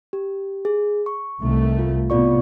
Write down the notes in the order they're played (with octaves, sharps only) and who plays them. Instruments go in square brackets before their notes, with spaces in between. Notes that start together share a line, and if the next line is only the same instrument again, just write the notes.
[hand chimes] G4
G#4
C#6
[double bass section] C2 D#3 A3
[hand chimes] F4
[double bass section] A2 C3 B3 [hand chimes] F4 D5 C#6